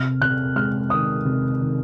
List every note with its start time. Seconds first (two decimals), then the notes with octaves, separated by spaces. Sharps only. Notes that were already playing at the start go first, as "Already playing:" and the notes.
Already playing: C3 F6
0.21 C3 F#6
0.56 G#3 F6
0.90 D#3 D#6
1.25 C3
1.59 D#3